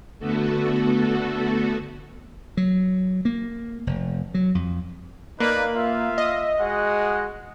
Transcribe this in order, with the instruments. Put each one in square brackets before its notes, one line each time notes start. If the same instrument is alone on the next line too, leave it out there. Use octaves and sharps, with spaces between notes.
[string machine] D3 A3 B3 F#4 A4
[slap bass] F#3
A#3
F1
F#3
F2
[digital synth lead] A#3 [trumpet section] D#4 B4 D5
[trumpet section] F4 E5 F5
[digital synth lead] D#5
[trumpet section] G#3 F#4 F#5